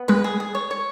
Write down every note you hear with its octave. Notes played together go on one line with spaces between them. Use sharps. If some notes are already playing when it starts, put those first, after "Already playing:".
Already playing: B3
G#3 B4
G#4
G#4
C#5
C#5